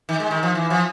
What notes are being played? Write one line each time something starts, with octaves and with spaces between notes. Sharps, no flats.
D#3
G#3
D#3
F3
E3
F3